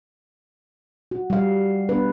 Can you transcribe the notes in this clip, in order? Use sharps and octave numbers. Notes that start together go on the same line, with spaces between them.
F#4
G3 F5
B3 D4 B4